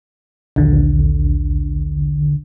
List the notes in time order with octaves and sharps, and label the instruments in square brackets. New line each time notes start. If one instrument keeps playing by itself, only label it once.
[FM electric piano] A#1 D#2 D3